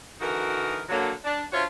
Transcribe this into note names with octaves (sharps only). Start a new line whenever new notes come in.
D3 E3 D#4 F#4 A#4
D3 F#3 A#3
D4
D4 F4 F#4 C5 C#5 E5